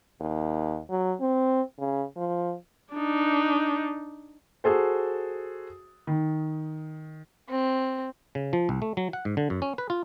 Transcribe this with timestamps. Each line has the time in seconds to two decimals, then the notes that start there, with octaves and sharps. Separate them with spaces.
0.20 D#2
0.90 F#3
1.21 C4
1.78 C#3
2.16 F3
2.94 D4 D#4
4.64 F#4 G#4 A4 C5
6.07 D#3
7.50 C4
8.35 C#3
8.53 F3
8.69 C2
8.82 A3
8.97 F#3
9.13 F#5
9.25 G#2
9.37 D3
9.50 F#2
9.62 C#4
9.78 B4
9.90 F4